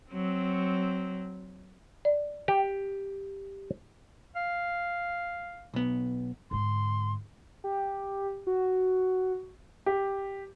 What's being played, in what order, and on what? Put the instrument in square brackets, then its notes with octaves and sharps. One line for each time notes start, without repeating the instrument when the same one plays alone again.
[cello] F#3 C4
[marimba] D5
[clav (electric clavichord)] G4
[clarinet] F5
[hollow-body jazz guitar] B1 B3
[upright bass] G#2 D3 [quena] C6
[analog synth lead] G4
F#4
[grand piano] G4